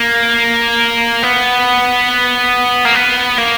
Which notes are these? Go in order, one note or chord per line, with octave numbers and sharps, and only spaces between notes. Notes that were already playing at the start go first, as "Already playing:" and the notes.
Already playing: A#3
B3
A#3
B3
A#3